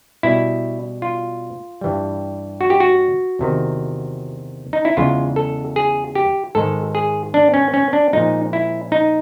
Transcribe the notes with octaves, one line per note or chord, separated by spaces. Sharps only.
B2 G3 E4
F4
G2 E3 G3
F#4
G4
F#4
E2 C3 D#3
D#4
E4
E2 C#3 E3 G#3 F4
A4
G#4
G4
G#2 D#3 G#3 A4
G#4
D4
C#4
C#4
D4
A#2 F3 G#3 D#4
E4
D#4